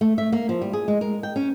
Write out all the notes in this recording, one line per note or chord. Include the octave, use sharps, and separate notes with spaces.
A3
E5
A#3
F3
G3
G#4
G#3
A#4
G5
C#4